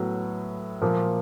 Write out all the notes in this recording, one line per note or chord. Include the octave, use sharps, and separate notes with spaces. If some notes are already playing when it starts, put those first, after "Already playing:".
Already playing: A2 F#3 B3
A#2 F3 A#3